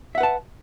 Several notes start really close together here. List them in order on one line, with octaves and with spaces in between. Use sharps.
E5 F#5 B4 A5